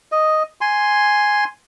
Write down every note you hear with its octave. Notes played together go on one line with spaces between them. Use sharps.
D#5
G#5 C6